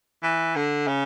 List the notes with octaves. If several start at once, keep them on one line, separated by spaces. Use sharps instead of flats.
E3
D3
C#3